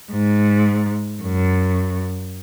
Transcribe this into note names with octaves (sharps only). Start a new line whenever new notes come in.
G#2
F#2